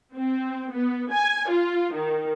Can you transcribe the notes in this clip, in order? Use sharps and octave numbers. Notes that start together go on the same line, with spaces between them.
C4
B3
G#5
F4
D#3